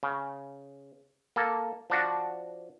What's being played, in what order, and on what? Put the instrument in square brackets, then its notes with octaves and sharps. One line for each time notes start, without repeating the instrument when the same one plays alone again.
[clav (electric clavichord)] C#3
A#3 A4
F3 D4 F#4